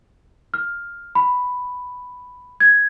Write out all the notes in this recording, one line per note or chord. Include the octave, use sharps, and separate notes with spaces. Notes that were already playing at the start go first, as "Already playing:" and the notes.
F6
B5
G#6